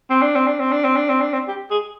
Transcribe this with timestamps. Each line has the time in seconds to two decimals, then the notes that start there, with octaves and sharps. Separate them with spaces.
0.10 C4
0.22 D4
0.36 C4
0.47 D4
0.60 C4
0.72 D4
0.84 C4
0.97 D4
1.09 C4
1.22 D4
1.33 C4
1.48 G4
1.70 G#4